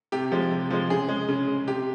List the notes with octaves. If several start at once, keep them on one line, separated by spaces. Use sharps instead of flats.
C3 G4
F3 G#3
C3
F3 G#3
C#3 G#4
G#3
C#3
G#3
C3 G4